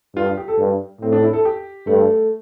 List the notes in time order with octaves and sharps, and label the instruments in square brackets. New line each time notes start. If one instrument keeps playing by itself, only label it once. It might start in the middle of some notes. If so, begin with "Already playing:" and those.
[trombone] G2 [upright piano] F4
[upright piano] G4
G4
A4
[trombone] G2
[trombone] A2 [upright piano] C4
[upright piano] D4
E4
A4
G4
[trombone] G2 [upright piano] A3